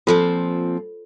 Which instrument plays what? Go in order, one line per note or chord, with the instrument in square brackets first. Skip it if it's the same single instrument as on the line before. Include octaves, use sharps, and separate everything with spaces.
[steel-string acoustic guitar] A#2 F3 C4 [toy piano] F4 A4 C5